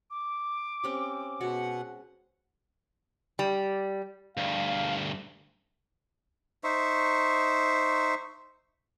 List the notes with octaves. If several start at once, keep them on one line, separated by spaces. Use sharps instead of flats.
D6
C4 C#4 G4
B2 G#3 F#4 F#5
G3
D2 G2 F5
D#4 C5 E5 C#6